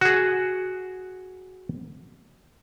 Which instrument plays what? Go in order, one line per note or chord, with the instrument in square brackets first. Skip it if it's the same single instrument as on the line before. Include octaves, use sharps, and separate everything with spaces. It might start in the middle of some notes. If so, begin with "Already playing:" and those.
[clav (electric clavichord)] F#4 G#4